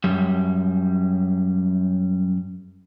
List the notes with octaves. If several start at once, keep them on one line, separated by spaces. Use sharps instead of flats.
F#2 G3